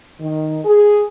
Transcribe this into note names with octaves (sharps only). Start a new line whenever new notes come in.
D#3
G#4